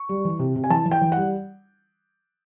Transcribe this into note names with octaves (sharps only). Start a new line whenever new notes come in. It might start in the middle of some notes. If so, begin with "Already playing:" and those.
Already playing: C#6
G3
E3
C3
C3
G#5
E3 A5
E3
G5
E3
F#5
G3